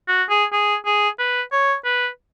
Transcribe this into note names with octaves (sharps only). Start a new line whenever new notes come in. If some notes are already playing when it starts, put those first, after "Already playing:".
F#4
G#4
G#4
G#4
B4
C#5
B4